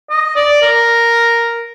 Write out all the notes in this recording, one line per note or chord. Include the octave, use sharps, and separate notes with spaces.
D#5
D5
A#4